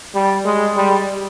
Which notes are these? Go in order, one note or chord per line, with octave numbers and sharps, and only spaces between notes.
G3
G#3
G3